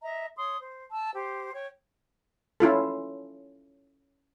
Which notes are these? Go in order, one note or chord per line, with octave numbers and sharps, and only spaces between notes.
D#5 E5 A#5
C#5 C6 D#6
C5
A5 E6
G4 C5
C#5 G5
C#4 E4 F4 A4